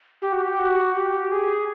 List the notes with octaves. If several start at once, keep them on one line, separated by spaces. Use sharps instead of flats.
G4
F#4
G4
F#4
G4
G#4